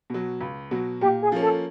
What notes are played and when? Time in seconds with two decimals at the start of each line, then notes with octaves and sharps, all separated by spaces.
0.10 B2 F#3
0.41 C#2
0.71 B2 F#3
1.01 A#2 G4
1.23 G#4
1.32 F3 A#3 C#4
1.43 A4